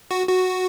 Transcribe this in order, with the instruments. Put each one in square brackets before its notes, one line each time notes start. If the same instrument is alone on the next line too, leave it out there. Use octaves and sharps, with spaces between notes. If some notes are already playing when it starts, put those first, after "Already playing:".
[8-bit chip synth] F#4
F#4